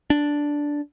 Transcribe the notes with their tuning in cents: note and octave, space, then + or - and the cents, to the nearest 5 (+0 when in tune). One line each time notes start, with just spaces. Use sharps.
D4 -5